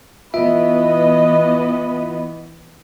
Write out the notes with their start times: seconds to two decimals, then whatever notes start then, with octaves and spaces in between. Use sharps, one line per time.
0.34 E3 B3 F4 B4 D#5 E5